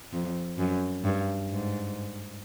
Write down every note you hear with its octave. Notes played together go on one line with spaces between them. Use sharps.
F2
F#2
G2
G#2